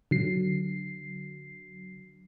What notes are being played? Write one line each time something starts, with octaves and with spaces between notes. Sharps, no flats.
D3 F#3 C7